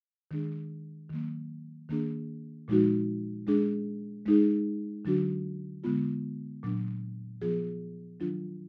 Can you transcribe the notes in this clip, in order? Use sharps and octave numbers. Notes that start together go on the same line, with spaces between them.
D#3 G#3 D4 G#4
D#3 F#3 A#3
D#3 A#3 D4 G#4
A#2 F3 G#3 D#4 F#4
G#3 D4 G#4
G#3 D#4 G#4
D3 F#3 D4 F#4
D3 G#3 B3 F4
A#2 F#3 A#3 D4
F3 B3 F4 G#4
D#3 F#3 D4 F4